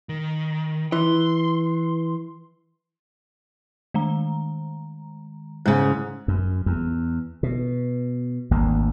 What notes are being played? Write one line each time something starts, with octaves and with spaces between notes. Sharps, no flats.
D#3
E3 C6
D#3 G#3 A#5
G#2 C#3 F#6
F#2
E2
B2
G#1 D2 A#3